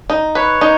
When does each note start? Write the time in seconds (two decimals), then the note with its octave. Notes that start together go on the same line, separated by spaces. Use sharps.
0.10 D#4
0.35 B4 C#5
0.61 D#4